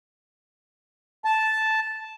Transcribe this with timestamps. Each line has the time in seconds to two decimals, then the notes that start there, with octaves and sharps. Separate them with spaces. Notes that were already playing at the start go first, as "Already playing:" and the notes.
1.25 A5